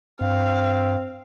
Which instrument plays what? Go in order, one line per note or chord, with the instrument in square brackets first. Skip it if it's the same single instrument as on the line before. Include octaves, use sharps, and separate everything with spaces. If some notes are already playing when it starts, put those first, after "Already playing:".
[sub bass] G2 [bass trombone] C4 [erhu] F5